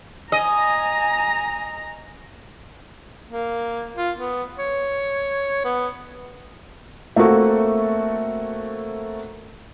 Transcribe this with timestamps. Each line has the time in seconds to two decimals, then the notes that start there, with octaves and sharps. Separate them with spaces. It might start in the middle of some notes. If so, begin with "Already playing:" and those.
0.32 D#5 G#5 A#5
3.30 A#3
3.96 F4
4.17 B3
4.59 C#5
5.65 B3
7.16 A3 A#3 C4 F#4 A4